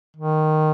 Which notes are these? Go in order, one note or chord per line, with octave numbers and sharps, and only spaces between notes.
D#3